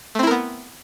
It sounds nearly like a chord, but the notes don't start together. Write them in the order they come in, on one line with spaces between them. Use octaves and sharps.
A3 C4 E4 A#4 B3